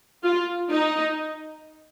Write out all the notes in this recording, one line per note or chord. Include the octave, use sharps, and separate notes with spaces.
F4
D#4